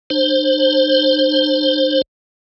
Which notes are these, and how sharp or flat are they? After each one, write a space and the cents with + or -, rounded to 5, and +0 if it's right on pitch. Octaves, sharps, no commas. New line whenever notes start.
D4 +35 C5 +15